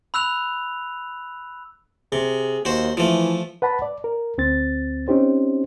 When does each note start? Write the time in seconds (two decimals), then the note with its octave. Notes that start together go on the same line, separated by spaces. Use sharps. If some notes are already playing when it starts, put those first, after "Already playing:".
0.14 B5 E6 F#6 F7
2.12 C3 G#4
2.65 D#2 F#4 C5
2.97 E3 F3 A3
3.62 B4 F#5 A5 B5
3.82 D5
4.04 A#4
4.38 D2 C4 A6
5.08 C4 C#4 D#4 G4 C5